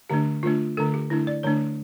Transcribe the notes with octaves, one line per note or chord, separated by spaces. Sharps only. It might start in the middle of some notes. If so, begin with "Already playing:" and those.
D3 A3 D4 G4
D3 A3 D4 F4
D3 A3 D4 A4
G4
D3 A3 D4 E4
D5
D3 A3 D4 C#5